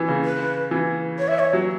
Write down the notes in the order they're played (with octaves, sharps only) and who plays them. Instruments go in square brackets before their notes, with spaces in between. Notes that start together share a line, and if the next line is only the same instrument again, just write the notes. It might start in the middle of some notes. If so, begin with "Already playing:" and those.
Already playing: [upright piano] E3
C#3
[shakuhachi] B4
[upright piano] E3
[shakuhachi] C#5
E5
C#5
[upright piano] F#3